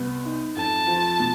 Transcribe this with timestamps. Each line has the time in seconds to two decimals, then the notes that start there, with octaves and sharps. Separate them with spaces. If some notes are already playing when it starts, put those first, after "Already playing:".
Already playing: C2 B3
0.25 D#4
0.56 F2 A5
0.88 F3
1.19 B2